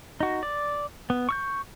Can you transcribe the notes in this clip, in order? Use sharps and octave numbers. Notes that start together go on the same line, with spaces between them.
D#4 F#4
D5
B3
C#6 E6 G6